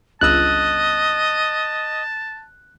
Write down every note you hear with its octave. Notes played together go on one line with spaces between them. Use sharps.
G1 C#2 D#5 A5 E6 F#6